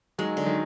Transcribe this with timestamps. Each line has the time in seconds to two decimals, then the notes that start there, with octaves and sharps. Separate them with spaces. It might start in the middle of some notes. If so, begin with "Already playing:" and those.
0.18 D#3 F#3 G#3
0.37 D3
0.46 D#3 F#3